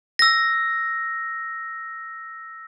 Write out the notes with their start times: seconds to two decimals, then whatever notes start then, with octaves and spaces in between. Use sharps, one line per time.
0.19 E6 A#6